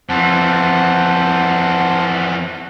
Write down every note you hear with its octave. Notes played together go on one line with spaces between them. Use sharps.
F2 E3 C5 F#5 A5